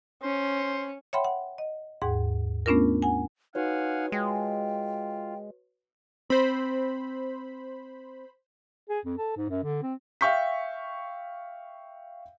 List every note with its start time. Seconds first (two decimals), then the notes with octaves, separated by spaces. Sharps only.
0.23 C#4 C5
1.13 C#5 E5 F#5 G5 B5 C6
1.24 F#5
1.58 D#5
2.02 D#2 G#2 G#4 F#5
2.66 A3 B3 C#4 D4 F4 A#4
3.02 F#5 G#5
3.55 D#4 F#4 B4 C#5 F5 F#5 G#5
4.12 G#3 F4 G5
6.30 C4 C5 B5
8.89 G#4
9.05 F2
9.18 A4
9.37 G#2
9.49 F#2
9.63 D3
9.82 C4
10.21 E5 F5 G5 C#6 G6 B6